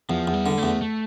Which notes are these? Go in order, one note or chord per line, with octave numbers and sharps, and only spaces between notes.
E2 F3
E2
G3
D3
A3
E2
A3